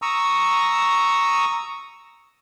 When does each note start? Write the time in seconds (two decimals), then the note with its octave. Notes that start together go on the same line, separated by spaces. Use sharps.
0.02 A#5 C#6 D#6 E6